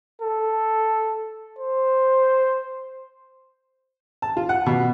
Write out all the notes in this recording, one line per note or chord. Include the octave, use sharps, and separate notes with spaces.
A4
C5
A5
F4
F#5
B2